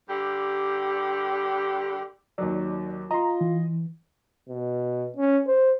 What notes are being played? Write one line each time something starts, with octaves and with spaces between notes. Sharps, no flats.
G2 D3 G4
D#2 D#3 F#3 D5
F4 D#5 A#5 C6
E3
B2
C#4
C5